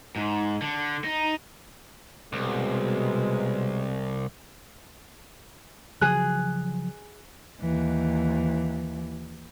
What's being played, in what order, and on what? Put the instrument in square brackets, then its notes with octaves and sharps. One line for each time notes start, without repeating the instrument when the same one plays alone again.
[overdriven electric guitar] G#2
D3
D#4
[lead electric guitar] C2 [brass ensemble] B2 G#3
[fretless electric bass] C#3 F3 F#3 [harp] G#4 F#6
[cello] D#2 E3